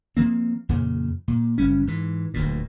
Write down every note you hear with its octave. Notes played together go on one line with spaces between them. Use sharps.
F3 A#3 C4
F2 A#2 C#3
A#2
F#1 G3 C#4
G#2 E3
D1 D2 A#2